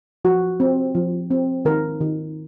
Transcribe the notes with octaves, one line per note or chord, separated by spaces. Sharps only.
F3 F#4
C4
F3
C4
D#3 A#4
D#3